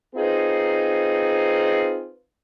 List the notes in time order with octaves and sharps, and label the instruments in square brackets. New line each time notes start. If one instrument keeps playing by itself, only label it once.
[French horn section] C4 D#4 F4 G#4 B4